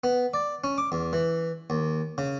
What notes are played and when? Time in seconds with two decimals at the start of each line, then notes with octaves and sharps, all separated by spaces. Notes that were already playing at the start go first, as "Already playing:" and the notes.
0.04 B3
0.34 D5
0.64 C#4
0.78 D6
0.92 E2
1.13 E3
1.70 D#2
2.18 C#3